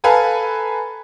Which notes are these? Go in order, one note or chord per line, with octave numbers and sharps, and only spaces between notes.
A4 B4 F5 G#5 A#5